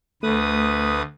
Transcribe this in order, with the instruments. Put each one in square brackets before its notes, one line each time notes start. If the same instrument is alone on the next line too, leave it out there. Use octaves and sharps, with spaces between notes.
[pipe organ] D2 B4 D#6 [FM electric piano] A3